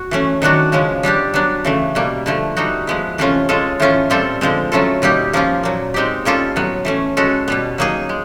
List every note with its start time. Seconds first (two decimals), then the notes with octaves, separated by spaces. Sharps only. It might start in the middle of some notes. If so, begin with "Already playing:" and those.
Already playing: F#4
0.11 E3 A3 C#4
0.42 D#3 F#3 B3 D4 F#4
0.72 C#3 F3 G#3 C#4
1.03 G3 B3 D4 G4
1.34 F#3 B3 D4
1.64 C#3 E3 A3
1.95 B2 G3 A#3
2.26 D3 F3 A3
2.57 G3 B3 D#4 F#4
2.87 F3 G#3 B3 E4
3.18 C3 E3 A3 C#4 F4
3.49 G#3 C#4 F4 A4
3.80 A2 E3 A3 C#4 F4
4.10 A#2 G3 C4 F4 A4
4.41 D3 F3 G#3 C4
4.72 F#3 A3 C#4 F4 A4
5.02 B2 G3 A#3 D#4 G4
5.33 F3 A#3 C#4 F4
5.63 A#2 F#3 A#3
5.94 G#3 C4 D#4 G4
6.25 G3 A#3 C#4 F4 A4
6.56 A2 F#3 B3
6.85 E3 A3 C#4
7.17 G#3 C#4 F#4 A4
7.48 B2 G3 B3
7.78 F#3 A#3 D#4 G#4
8.09 G#3